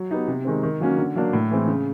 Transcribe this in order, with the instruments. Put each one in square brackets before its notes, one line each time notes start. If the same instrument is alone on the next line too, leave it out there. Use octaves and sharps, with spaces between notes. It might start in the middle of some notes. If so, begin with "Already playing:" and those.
Already playing: [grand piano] F#3
B3 D#4 G4
C3
D#3 G#3 C4
D#3
F#3 A#3 C#4 F#4
D3
F#3 A#3 D4
A2
E3 G#3 C4
C#3